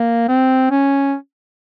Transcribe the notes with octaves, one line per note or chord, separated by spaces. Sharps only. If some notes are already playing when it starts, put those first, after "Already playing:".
Already playing: A#3
C4
C#4